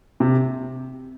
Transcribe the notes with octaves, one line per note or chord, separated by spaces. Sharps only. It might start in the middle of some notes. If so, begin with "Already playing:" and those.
C3